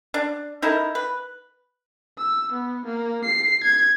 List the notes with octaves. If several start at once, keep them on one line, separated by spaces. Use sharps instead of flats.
D4
D#4 E4 A4 A#4
B4
E6
B3
A#3
C7
G#6